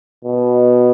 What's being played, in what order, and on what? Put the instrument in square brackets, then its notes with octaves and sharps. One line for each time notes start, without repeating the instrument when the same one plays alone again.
[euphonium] B2